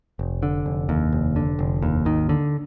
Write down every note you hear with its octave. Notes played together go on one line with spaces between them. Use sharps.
F1
D3
F1
D#2
F1
D3
F1
D#2
G#1 D#3
D3